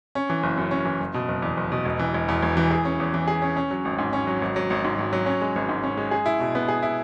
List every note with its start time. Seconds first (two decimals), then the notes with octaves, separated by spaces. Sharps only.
0.15 C#4
0.30 E3
0.43 F#1
0.57 F#2
0.71 C#4
0.85 E3
1.00 F#1
1.14 B2
1.28 F#1
1.42 E2
1.57 F#1
1.72 B2
1.85 E1
1.99 E3
2.14 E1
2.29 E2
2.43 E1
2.57 E3
2.71 G#4
2.85 C#4
3.00 E2
3.14 E3
3.27 G#4
3.42 C#4
3.57 C#4
3.71 F#3
3.85 G#1
3.98 G#2
4.13 C#4
4.27 F#3
4.42 G#1
4.56 F#3
4.70 G#1
4.84 G#2
4.99 G#1
5.13 F#3
5.26 C#4
5.41 G#3
5.56 G#1
5.69 G#2
5.83 C#4
5.97 G#3
6.11 G#4
6.26 E4
6.40 B2
6.55 B3
6.68 G#4
6.82 E4